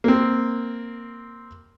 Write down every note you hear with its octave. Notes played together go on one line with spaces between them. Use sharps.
A#3 C4